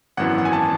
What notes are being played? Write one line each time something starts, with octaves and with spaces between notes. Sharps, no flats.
G#1 F#2 E3 B3 F#5
F#5
G#5
A5